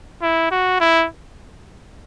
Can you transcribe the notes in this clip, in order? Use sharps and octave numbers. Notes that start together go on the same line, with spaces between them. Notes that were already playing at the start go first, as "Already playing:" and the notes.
E4
F#4
E4